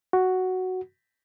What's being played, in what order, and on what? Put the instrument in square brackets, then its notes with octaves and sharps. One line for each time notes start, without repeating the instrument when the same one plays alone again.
[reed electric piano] F#4